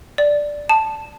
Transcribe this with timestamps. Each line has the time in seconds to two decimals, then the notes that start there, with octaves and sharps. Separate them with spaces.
0.18 D5
0.69 A5